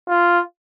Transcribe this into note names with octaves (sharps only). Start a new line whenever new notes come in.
F4